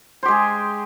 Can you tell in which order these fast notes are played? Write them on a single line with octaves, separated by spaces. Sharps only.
C5 G4 G#3 G#4